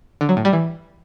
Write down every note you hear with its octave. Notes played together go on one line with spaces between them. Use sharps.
D3
F#3
A2
G3
E3